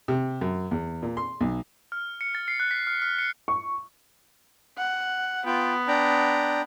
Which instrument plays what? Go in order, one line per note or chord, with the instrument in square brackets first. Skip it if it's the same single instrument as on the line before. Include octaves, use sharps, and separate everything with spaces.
[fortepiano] C3
F#2
E2
A#2
C6
B1
[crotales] F6
C#7
A6
C7
F#6
B6
F6
F6
C#7
[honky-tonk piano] C#6
[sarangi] F#5
[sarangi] B3 [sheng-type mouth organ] F4 G5
[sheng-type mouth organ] D4 G5 A#5